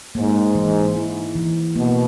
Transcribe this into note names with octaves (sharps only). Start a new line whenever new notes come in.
G#2 A#3
E3
E4
E3
B2 A#3